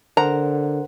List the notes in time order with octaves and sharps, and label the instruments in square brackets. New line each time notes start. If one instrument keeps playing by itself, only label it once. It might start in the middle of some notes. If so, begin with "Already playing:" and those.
[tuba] D3 [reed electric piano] A#4 C5 F#5 [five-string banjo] A#5